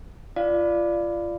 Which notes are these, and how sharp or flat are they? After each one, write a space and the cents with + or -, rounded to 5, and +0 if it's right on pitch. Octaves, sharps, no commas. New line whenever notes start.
F4 -25 D5 +5 F5 -15